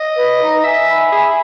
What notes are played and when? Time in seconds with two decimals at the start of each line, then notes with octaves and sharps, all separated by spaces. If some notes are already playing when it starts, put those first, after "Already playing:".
Already playing: D#5
0.16 B4
0.40 D#4
0.64 E5 G#5
0.88 B5
1.12 G#4 E5